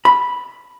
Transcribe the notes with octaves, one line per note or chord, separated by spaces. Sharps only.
B5